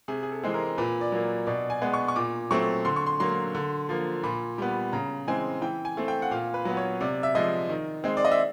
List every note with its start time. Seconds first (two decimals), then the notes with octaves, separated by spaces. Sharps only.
0.08 C3 G#4
0.23 G#4
0.32 A4
0.43 E3 G#3 C4
0.54 A#4
0.78 A#2 B4
1.01 D5
1.12 F#3 A#3
1.47 B2 D5
1.70 G#5
1.82 G#3 B3
1.94 C#6
2.08 C#6
2.16 A#2 D6
2.51 F#3 A3 C4 C#6
2.85 D3 C6
2.96 C#6
3.06 C6
3.20 F#3 A#3 C6
3.55 D3
3.89 F3 A#3
4.23 A#2 B5
4.58 G3 B3
4.93 C#3 A#5
5.27 E3 G#3 C4 G#5
5.62 E3 G5
5.85 G#5
5.97 A3 C4
6.08 G5
6.22 F#5
6.31 A#2 F5
6.54 B4
6.65 F#3 B3
6.77 C#5
7.00 C3 D5
7.23 E5
7.35 F3 G#3 D#5
7.69 D#3
8.04 G#3 C4
8.17 D5
8.25 D#5
8.32 E5